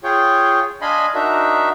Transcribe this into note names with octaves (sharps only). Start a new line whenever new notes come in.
F4 G#4 C#5 G5
D4 D#5 F5 G#5 B5 C6
D4 D#4 F#4 A#4 E5